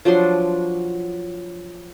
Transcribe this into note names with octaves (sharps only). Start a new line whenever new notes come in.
F3 F#3 D4 C6